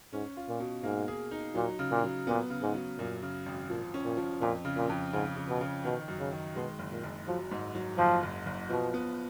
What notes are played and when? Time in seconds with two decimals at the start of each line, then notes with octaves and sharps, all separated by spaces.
0.13 G#2 C#4
0.37 F4
0.49 A#2
0.60 B2
0.84 G#2 A#3
1.08 G#4
1.31 D#4
1.55 A#2 F#3
1.79 C#3
1.91 A#2
2.03 F#3
2.27 A#2 B3
2.50 C#3
2.62 G#2
2.74 F#3
2.98 F#2 A#2
3.23 C#3
3.46 G#1
3.70 A#2 F3
3.94 C#4
4.05 A#2
4.17 F3
4.41 F2 A#2
4.65 C#3
4.77 A#2
4.89 F2
5.13 G#2 C#3
5.36 C#3
5.49 B2
5.61 C#3
5.84 B2 D#3
6.08 F#2
6.19 C#3
6.31 D#3
6.56 B2 G#3
6.79 F#1
6.92 A#2
7.03 F#1
7.27 F3 F#3
7.51 G#2
7.75 F#3
7.98 F#1 F3
8.23 F#1
8.46 F#1
8.70 B2 F3
8.94 B3